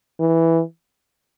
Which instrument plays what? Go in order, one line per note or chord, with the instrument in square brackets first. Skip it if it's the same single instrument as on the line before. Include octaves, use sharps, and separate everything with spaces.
[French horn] E3